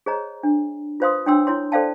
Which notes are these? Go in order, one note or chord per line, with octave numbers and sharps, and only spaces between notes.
G#4 C5 C#5 D#5 A#5
D4
F4 B4 C5 F5 C6 D#6
D4 C#5 G5 C6 E6
E4 C#5 C6
A4 C5 D5 F5 G5 A5